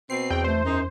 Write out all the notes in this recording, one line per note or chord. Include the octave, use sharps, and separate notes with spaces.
B2 C4 C7
E2 G5
A3 C5
F#2 D#4